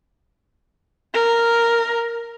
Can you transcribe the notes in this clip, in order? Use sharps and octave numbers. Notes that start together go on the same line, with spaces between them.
A#4